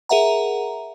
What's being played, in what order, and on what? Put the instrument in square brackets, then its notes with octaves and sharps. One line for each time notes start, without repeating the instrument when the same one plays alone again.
[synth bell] G#4 A#4 E5 F#5 A#5